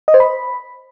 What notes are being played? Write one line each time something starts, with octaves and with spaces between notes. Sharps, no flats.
D#5
C5
B5